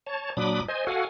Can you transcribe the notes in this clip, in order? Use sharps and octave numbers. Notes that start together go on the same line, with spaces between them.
C#5 A5
A#2 F#3 D4 B5 D6 D#6
C5 D#5 G#5
F#4 A4 F5 F#5 G#5